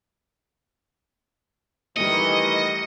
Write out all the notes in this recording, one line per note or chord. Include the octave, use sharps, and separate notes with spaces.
D#3 E3 G3 A3 D#5 C#7